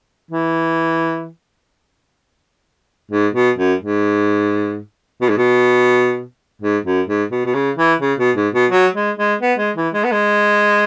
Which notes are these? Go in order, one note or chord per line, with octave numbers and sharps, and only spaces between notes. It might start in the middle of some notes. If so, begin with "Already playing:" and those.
E3
G#2
B2
F#2
G#2
B2
G#2
B2
G#2
F#2
G#2
B2
B2
C#3
E3
C#3
B2
G#2
B2
F#3
G#3
G#3
B3
G#3
E3
G#3
B3
G#3